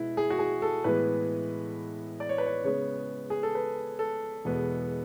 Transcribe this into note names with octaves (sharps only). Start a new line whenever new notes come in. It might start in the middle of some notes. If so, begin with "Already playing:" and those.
Already playing: B2 G#3 B3 E4
G#4
F#4
G#4
A4
A2 E3 G#3 B3 B4
D5
C#5
B4
C#5
C#3 G#3 B3 C#5
G#4
A4
B4
A4
E2 B2 G#3 B3